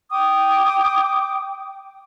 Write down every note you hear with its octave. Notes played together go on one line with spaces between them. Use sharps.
G5 D6 D#6